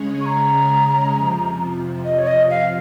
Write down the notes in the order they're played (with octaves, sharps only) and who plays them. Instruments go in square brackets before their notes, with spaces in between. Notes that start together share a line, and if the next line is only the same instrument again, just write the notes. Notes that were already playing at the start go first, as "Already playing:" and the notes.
Already playing: [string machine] C#3 G#3 C#4 G#4 C#5
[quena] C#6
A#5
[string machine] F2 C3 F3
[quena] D#5
C#5
D#5
F5